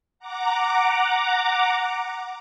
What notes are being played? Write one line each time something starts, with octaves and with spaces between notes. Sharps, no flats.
F#5 A#5 D6